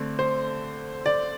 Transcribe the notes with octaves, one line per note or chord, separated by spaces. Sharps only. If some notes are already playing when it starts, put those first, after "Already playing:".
Already playing: D3 A3 C4
C5
D5